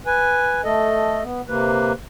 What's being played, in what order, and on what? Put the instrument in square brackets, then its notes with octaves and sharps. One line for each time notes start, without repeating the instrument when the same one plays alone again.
[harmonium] B4 G#5
A3 A4 D#5
B3
C3 A#3 B4